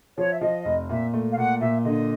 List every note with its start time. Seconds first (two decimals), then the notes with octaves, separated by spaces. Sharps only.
0.18 F3 C#5
0.32 E5
0.41 F3 D#5
0.65 F1
0.89 A#2 E5
1.14 A3
1.31 F5
1.37 A#2 F#5
1.61 A#2 E5
1.84 D3 D#5